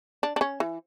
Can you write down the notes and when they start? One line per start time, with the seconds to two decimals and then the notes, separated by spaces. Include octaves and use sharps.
0.23 D4
0.36 D4
0.41 C#4
0.60 E3